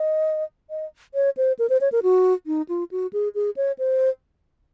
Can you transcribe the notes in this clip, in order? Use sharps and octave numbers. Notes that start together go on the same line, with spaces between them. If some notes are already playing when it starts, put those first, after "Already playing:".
Already playing: D#5
D#5
C#5
C5
A#4
C5
C#5
A#4
F#4
D#4
F4
F#4
G#4
G#4
C#5
C5